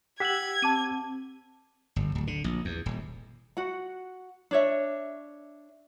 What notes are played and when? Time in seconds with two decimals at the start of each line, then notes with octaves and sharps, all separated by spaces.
0.20 G4 F#5 E6 G#6 B6 F#7
0.62 C4 A5 D6 D#7
1.96 G1
2.15 D1
2.27 D3
2.44 A#1
2.65 E2
2.86 D#1
3.57 F#4 F#5
4.51 D4 C#5 E5